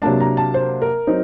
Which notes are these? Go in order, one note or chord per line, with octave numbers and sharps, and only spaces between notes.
C3 F#3 A#3 D4 A5
A#5
A5
C5
A#4
F#3 C4 D#4